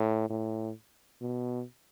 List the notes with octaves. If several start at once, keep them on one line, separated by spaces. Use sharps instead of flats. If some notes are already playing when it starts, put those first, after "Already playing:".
Already playing: A2
A2
B2